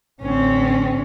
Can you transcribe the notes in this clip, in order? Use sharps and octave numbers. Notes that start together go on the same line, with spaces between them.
A1 D3 C4 C#4